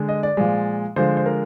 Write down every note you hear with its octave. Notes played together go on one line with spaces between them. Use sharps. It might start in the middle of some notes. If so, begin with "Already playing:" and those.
Already playing: D3 G#3
D#5
D5
A#2 F3 G#3
D3 F3 G#3 C5
C5
A#4